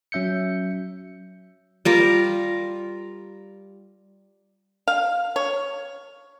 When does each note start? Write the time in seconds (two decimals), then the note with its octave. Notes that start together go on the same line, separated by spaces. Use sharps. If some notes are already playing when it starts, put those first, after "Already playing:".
0.12 F#3 C#4 E5 G6 C#7
1.85 G3 F4 A#4
4.88 F5
5.36 C#5